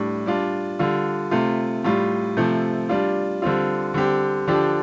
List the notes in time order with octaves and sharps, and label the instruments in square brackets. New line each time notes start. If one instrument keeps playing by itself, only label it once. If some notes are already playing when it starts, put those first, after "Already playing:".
Already playing: [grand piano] A2 G3 D4
G3 D4 F4
D3 G3 F4
C3 A3 F4
A2 G3 F4
C3 F3 A3
G3 D4 F4
D3 G3 C4 F4
D3 G3 C4 G4
D3 F3 D4 G4